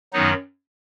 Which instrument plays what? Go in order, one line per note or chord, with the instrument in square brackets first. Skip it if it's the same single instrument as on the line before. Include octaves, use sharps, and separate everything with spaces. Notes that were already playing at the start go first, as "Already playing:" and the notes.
[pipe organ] F#2 D#3 F#3 B3 D#4